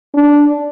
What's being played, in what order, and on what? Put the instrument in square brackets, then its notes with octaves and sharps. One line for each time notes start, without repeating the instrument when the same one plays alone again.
[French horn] D4